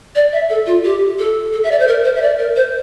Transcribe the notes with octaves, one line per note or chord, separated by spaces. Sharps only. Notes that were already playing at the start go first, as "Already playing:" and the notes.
D5
E5
A4
F4
G4
A4
A4
E5
D5
C5
A#4
C5
E5
D5
A#4
C5